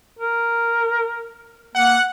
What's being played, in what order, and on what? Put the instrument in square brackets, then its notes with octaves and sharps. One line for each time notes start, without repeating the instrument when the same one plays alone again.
[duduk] A#4
[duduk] A#3 [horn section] F#5